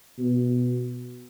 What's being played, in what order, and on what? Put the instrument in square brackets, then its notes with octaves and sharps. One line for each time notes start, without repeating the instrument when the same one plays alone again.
[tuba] B2